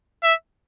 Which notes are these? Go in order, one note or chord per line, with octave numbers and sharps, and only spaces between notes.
E5